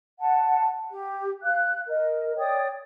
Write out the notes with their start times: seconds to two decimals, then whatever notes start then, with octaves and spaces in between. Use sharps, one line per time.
0.19 F#5 A5
0.91 G4
1.43 F5 F#6
1.88 A#4 D#5
2.37 C#5 D5 G5 D#6